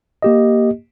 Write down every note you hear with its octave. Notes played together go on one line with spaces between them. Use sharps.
A#3 G4 D#5